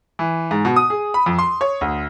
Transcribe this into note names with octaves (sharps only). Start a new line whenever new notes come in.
E3
G#2
B2
D#6
G#4
B5
F2
C6
C#5
D2